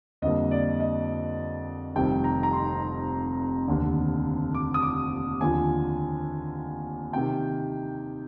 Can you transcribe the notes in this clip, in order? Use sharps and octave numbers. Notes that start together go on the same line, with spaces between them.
F2 D3 G3 A#3 D#5
D5
D#5
F1 F2 D#3 G3 G5
A#5
A#5
C6
F1 D#2 D3
D6
D#6
D6
D#2 D3 F3 G#5
C3 D#3 G5